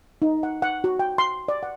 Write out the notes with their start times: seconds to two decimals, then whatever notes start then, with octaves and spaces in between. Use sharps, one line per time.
0.22 D#4
0.43 F#5
0.62 F#5
0.84 F#4
0.99 G5
1.18 C6
1.48 D5
1.63 F#5